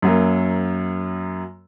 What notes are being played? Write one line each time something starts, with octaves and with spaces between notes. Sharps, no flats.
F#2 F#3 A#3